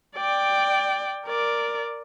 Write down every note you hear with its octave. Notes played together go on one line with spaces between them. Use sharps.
D5 G5
A#4 D5